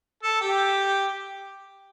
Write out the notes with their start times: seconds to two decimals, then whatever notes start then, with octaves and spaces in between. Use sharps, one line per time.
0.23 A4
0.41 G4